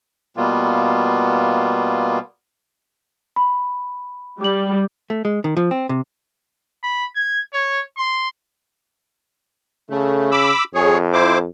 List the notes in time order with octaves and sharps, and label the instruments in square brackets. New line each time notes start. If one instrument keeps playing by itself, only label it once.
[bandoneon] B2 G3 A#3 B3 F4
[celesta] B5
[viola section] G3 [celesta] D6 F#7
[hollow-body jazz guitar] A3
G#3
D#3
F3
C4
C3
[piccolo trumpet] B5
G#6
C#5
C6
[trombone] C#3 [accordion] A3
[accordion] B5 D6 E6
[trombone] F2 [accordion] G#4 C#5
[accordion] E4 C5 D6